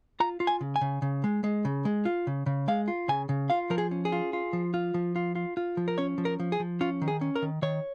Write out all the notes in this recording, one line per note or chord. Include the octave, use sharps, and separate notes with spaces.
F4 A#5
F4
G#5
C#3
G#5
C#3
C#3
G#3
G#3
C#3
G#3
F4
C#3
C#3
G#3 F5
F4
C#3 G#5
C#3
F4 F5
F3 A#4
G#4
C#4
G#4
F4
F4
F3
F4
F3
F4
F4
F4
F3
A#4
C#4 C#5
F3
A#4
F3
G#4
F3
C#4 F4
D#3
G#4
C#4
A#4
D#3
D#3 C#5